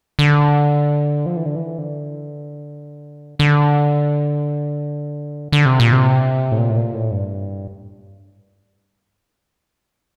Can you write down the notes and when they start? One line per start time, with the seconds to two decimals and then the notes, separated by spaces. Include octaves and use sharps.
0.19 D3
1.26 F3
1.36 E3
1.46 D3
1.56 E3
1.78 D3
3.39 D3
5.52 D3
5.66 C3
5.80 A#2
5.92 C3
6.52 A2
6.58 A#2
6.70 A2
6.77 A#2
6.94 A2
7.11 G2